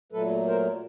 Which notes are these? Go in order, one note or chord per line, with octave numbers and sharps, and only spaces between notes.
A#2 F#3 A3 A4 B4
A#4 C5